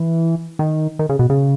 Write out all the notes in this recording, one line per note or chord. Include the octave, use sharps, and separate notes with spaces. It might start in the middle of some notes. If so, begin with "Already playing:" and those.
Already playing: E3
D#3
D#3
C#3
B2
C#3